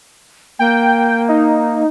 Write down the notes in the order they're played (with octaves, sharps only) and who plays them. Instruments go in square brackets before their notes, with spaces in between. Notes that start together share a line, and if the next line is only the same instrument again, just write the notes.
[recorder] A#3 [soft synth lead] G5
[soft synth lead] D#4